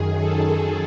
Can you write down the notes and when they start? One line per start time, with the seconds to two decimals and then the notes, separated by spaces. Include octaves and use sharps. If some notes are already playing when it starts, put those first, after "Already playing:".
Already playing: F#2 D#3 G#4
0.19 A4